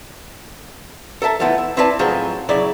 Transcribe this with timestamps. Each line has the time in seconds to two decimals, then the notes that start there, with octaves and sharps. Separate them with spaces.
1.22 A4 A#4 E5 A5
1.40 E3 F3 A3 B3 E4
1.58 E5
1.77 C4 E4 B4 D5 F5 A5
1.99 A2 F3 F#3 C4 D#4 G#4
2.49 C#3 F#3 E4 D5